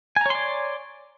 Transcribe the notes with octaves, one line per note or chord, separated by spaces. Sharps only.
C#5 D5 G#5 A#5 C6